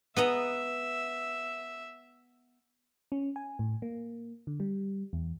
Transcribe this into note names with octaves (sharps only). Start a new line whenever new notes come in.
B3 D#5 E5 A#5
C#4
G#5
A2
A#3
D3
G3
E2